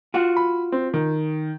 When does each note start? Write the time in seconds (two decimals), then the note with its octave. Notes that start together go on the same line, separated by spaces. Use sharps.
0.14 F4 F#4
0.37 B5
0.72 C4
0.94 D#3